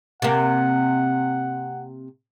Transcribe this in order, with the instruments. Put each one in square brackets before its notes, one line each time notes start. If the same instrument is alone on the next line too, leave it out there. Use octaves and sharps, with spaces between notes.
[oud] C3 A#3 [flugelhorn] F#5